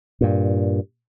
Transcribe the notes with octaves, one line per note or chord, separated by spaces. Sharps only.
G2 A#2